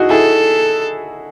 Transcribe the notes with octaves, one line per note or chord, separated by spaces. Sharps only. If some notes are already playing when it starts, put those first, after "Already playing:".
Already playing: D#4 E4 F#4 G#4
E4 G#4 A4